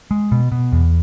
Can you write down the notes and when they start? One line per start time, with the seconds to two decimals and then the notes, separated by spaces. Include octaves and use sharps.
0.11 G#3
0.32 B2
0.52 B2
0.72 E2